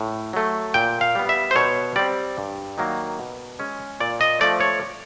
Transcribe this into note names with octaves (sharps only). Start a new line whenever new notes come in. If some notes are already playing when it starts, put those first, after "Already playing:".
Already playing: A2
F#3 A3
A#2 G5
F5
G3 B3
E5
C5
B2 C#5
G3 C4 D5
G2
D#3 F#3 A#3
B2
G#3 C#4
A#2 D5
D#5
F3 A3 D5
C#5